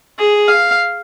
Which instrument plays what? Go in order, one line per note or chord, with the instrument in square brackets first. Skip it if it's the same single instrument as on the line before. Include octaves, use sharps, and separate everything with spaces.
[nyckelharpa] G#4
F5